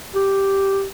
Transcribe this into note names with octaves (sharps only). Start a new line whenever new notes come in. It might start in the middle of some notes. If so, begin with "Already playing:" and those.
G4